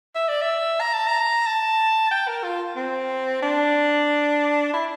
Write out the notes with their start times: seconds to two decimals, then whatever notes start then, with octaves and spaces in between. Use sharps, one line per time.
0.15 E5
0.29 D5
0.42 E5
0.81 A#5
0.94 A5
1.08 A#5
1.47 A5
2.11 G5
2.28 A#4
2.44 F4
2.76 C4
3.42 D4
4.73 E4